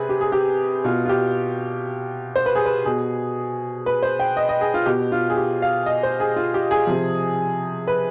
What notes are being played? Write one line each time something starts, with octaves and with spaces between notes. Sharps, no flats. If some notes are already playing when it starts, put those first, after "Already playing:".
Already playing: C3 G#4 B4
G4
G#4
G4
B2 F4
F4
G4
C5
B4
G#4
B4
B2 G#4
B4
C5
G5
D#5
D#5
G#4
F4
B2 G4
F4
G#4
G4
F5
D#5
C5
G#4
F4
G4
G#4
C3 F3
B4